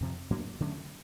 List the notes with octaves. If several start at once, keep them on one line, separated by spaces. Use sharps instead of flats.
F2 C3 F3
A2 F#3 A#3 D4
D3 F#3 A3 C#4